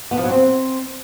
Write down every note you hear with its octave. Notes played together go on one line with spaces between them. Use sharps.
B3
F3
F#3
C4